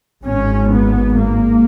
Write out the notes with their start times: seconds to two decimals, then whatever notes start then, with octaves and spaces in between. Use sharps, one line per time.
0.23 G#1 G#2 C#4
0.70 B3
1.16 A#3